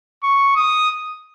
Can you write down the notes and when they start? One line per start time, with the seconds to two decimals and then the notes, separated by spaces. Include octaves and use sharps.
0.24 C#6
0.56 D#6